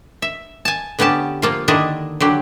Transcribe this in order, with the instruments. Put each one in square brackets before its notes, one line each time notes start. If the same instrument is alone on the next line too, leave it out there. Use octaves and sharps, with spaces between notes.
[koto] E5
G#5 A5
D3 B3 C#4 G4 A5
F3 A#3 F4
D3 D#3 D4 E4 D#5
D3 F#3 G4